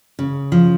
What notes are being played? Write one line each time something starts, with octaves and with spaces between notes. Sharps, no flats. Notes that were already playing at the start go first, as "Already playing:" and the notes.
C#3
F3